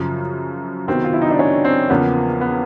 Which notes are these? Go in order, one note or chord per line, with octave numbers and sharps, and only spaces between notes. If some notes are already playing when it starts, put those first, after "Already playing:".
Already playing: F#2 C#3 F3
C3 D#3 F#3 B3 C4
F4
E4
D#4
D4
C#4
C4
E2 C#3 F3 A#3 B3 C#4
B3